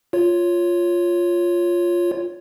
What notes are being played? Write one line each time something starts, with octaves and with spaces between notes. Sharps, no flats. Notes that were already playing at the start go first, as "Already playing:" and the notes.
F4 C#5